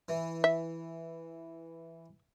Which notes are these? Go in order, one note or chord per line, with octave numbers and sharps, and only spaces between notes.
E3
E5